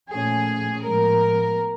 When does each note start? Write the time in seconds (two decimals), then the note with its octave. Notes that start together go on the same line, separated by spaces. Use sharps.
0.10 A#2 F3 A3 C#4 G#4
0.83 A2 F3 G#3 B3 A#4